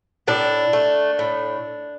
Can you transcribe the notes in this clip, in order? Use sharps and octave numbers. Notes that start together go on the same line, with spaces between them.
A2 D4
A3
A2